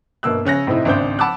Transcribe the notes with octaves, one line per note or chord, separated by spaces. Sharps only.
G1 B2 A#3 E6 F#6
C#3 C#4 F#6 A#6
A2 C3 C4 D#4 E4
G#1 C#2 D4 C5 E5 G6
F#5 A5 B5 D6 E6 F#6